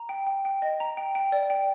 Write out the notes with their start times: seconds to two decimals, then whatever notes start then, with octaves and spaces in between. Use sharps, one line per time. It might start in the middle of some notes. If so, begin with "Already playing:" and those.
Already playing: A#5
0.09 G5
0.27 G5
0.45 G5
0.62 D#5
0.80 A#5
0.97 G5
1.15 G5
1.32 D5
1.50 G5